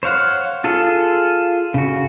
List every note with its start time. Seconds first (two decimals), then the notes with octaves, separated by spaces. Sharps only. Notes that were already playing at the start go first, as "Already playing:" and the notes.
0.03 C5 C#5 F5 F#5
0.64 F4 G#4 A4
1.74 C#3 F#4